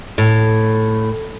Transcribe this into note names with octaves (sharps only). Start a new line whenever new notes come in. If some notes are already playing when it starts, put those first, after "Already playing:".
A2